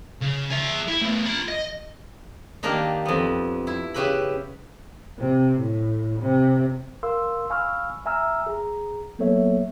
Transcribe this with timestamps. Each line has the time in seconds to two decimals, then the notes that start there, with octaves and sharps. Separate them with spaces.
0.22 C#3
0.51 G#4 E5
0.88 E4
1.02 A3 B3
1.26 F4 B5
1.48 D#5
2.63 D#3 A#3 D4 G4 A#4
3.05 F2 B3
3.67 E4
3.94 C#3 G4 B4 E5 B5
5.19 C3
5.60 A2
6.21 C3
7.03 A#4 F5 C6 E6
7.50 F5 G#5 B5 C#6 E6 F6
8.06 E5 G#5 A#5 E6 F6
8.47 G#4 A#5
9.19 F#3 A#3 B3 A4 C#5 E5